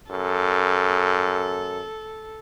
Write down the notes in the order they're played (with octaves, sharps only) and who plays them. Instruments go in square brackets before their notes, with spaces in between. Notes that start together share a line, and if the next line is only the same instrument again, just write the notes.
[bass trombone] F#2 [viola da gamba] A4